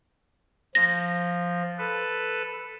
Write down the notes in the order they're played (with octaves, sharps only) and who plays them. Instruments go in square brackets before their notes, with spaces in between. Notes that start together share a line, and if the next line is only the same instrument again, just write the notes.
[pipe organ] F3 [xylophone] A#6
[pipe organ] A4 B4